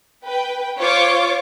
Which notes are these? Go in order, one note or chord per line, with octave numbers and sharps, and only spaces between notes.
B4 G5
F4 C5 C#5 C#6 D6